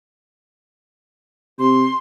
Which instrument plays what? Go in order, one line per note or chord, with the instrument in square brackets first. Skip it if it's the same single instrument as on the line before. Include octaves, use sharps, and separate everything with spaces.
[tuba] C3 [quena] C6